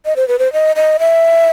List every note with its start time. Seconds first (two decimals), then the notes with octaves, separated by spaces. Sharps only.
0.05 D#5
0.16 C5
0.28 B4
0.39 C5
0.53 D#5
0.76 D#5
0.99 E5